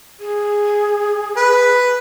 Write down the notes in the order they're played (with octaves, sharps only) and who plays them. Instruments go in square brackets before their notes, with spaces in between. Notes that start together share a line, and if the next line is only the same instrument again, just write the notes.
[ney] G#4
[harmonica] B4